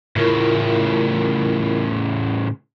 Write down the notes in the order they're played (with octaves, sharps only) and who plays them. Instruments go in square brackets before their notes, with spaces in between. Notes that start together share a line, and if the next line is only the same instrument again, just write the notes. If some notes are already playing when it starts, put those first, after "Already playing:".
[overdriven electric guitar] A2 C#3 [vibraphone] E4 F4 A#4